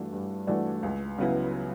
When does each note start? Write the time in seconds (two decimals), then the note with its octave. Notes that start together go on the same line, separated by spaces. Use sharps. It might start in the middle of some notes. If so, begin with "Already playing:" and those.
Already playing: G2 E3 A3 D4 F#4
0.12 G2
0.47 E3 A3 D4 F#4
0.83 C#2
1.18 C#3 F#3 B3 E4